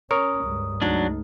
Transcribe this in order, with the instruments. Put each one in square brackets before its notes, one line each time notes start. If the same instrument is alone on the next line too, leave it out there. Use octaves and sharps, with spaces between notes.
[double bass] C#4 [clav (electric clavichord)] A#4 C#5 [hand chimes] D#6
[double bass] C#2 G2
[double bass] C#2 [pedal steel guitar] F#3 D4 [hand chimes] A3 D#4